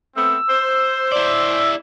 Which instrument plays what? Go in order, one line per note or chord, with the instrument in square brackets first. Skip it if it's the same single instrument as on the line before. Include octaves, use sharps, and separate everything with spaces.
[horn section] A3 B3 C4 [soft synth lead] E6
[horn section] C5
[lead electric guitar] E4 D5